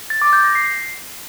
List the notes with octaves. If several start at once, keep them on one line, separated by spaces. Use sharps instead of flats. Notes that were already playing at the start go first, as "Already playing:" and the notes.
A6
D6
G6
A#6
C7